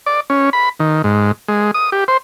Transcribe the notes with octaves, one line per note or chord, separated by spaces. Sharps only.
D5
C#4
B5
D#3
G#2
G#3
D#6
G4
C5